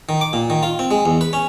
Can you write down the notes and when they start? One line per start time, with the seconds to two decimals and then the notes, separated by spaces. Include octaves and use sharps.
0.09 D#3
0.21 D6
0.33 A#2
0.50 D#3
0.63 F4
0.79 C4
0.91 G#3
1.06 E2
1.21 B4
1.33 C#4